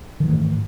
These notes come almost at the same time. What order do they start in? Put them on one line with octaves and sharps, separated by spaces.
D#3 E3 A3 G#2